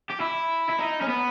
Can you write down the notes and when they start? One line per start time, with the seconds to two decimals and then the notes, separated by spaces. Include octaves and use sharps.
0.10 G4
0.20 E4
0.70 E4
0.79 D#4
1.02 C#4
1.09 B3